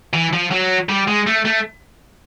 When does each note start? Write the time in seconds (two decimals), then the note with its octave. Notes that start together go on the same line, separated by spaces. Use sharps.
0.13 E3
0.33 F3
0.51 F#3
0.89 G3
1.08 G#3
1.27 A3
1.45 A3